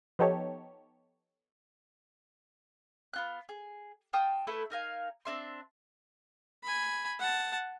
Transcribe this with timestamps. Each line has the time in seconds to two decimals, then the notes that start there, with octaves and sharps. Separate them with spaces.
0.19 F3 B3 D#4 G4 A4 C#5
3.13 B3 F4 F#6
3.49 G#4
4.13 F4 G5 A5 D#6
4.47 A3 E4 A4 B4
4.70 D#4 A#4 F5 G#5
5.25 C4 D4 E5 C6
6.64 G#5 B5
7.19 F#5 A5